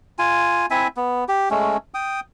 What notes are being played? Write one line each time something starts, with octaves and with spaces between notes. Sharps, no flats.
F4 G#5
C4 E4 E5 G#5
B3
G4
G#3 A3 C#4
G5 D#6